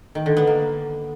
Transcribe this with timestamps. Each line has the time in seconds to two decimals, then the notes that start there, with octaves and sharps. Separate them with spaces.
0.15 D#3
0.26 D3
0.37 B3
0.47 A#3